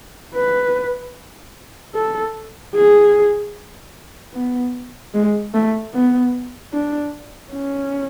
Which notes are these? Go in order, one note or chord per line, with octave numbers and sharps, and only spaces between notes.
B4
A4
G#4
B3
G#3
A3
B3
D4
C#4